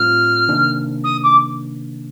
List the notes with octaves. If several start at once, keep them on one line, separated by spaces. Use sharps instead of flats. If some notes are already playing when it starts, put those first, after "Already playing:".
Already playing: A2 G3 C4 F4 F6
C3 D#3 A#3 D4
D#6
D6